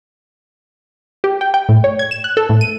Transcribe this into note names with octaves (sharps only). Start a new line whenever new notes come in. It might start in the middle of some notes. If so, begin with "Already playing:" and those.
G4
G5
G5
A2
C#5
G#6
E7
F#6
A4
A2
D#7